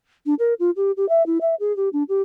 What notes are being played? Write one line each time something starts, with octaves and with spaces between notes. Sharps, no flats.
D4
A#4
F4
G4
G4
E5
E4
E5
G#4
G4
D4
G4